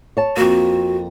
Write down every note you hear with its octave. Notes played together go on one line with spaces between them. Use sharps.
C#5 A5
F2 A#3 F#4